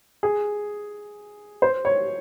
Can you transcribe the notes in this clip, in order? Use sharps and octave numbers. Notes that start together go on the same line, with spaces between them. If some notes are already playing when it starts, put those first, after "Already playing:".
G#4
C5
C#5